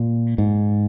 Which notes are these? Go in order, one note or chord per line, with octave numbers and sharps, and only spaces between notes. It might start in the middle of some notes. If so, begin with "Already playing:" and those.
Already playing: A#2
G#2